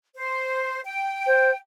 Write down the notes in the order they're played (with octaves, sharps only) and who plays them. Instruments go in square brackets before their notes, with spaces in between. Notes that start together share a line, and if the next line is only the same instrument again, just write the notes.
[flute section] C5
G5
[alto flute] C5